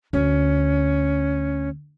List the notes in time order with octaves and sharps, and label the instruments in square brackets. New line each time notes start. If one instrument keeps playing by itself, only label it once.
[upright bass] D2 [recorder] C#4